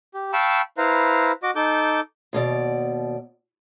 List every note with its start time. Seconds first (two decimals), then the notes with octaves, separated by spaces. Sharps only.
0.14 G4
0.33 F5 G5 A5 B5 C#6 E6
0.78 E4 B4 C5 F5 A#5
1.43 F#4 D#5 D6
1.56 D#4 A4 D6 G6
2.33 D#2 B2 D5